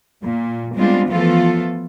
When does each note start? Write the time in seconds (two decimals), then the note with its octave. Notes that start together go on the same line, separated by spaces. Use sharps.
0.23 A#2
0.75 G3 G#3 B3 C4 D4 F4
1.08 E3 F3 A3 B3 F4 A4